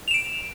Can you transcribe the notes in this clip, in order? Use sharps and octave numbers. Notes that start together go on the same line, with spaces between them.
D7 E7 F7